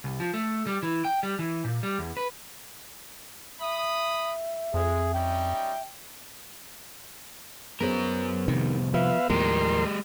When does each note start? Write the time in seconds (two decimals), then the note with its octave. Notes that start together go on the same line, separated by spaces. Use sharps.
0.04 C2
0.20 F3
0.34 A3
0.67 G3
0.83 E3
1.05 G5
1.23 G3
1.39 E3
1.65 A#2
1.83 G3
1.99 E2
2.17 B4
3.61 E5 B5 D#6
4.74 F2 G#3 G#4
5.14 G3 C#4 D#4 G5
7.80 F#2 B3 G#4 A#4 C5
8.48 C2 F2 C3 D#3
8.94 F3 B4 E5 F5
9.30 D#2 A2 F3 G#3 G4 A#4 C6